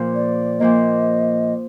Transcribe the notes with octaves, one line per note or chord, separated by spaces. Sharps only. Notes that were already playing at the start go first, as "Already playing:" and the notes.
Already playing: A#2 F3 A#3
D5
A#2 F3 A#3 D#5